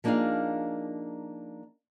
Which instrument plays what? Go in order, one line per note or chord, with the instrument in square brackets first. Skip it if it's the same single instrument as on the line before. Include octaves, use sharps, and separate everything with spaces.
[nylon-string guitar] F3 A#3 D4 D#4 G#4 F5